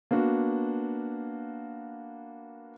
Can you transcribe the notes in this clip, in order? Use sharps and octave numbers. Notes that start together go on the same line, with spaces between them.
A#3 B3 D4 F#4